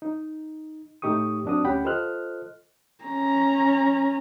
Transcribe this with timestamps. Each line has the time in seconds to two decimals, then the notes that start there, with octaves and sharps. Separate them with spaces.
0.02 D#4
1.02 A2 A3 D#4 G4 C#6 D#6
1.45 F#2 C4 D4 F#4 D#6
1.65 D2 C#4 G4 F#5 G5 B5
1.84 F4 A4 C5 D#5 F6 F#6
3.04 C#4 A#5